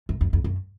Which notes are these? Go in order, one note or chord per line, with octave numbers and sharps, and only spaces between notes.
F#2
F2
F2
F#2